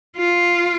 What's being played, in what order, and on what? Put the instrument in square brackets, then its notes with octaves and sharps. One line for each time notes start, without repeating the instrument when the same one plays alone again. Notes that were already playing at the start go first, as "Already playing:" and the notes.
[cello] F4